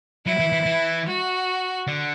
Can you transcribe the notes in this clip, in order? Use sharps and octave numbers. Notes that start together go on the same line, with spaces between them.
F#3 E4
E3
E3
E3
F#4
D3